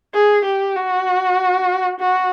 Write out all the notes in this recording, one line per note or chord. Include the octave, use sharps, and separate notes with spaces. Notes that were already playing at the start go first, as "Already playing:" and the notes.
G#4
G4
F#4
F#4